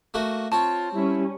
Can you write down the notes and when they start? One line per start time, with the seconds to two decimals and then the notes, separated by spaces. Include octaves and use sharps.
0.14 A3 A#3 F#4
0.52 C4 F4 C#5 A5
0.94 G3 C#4 E4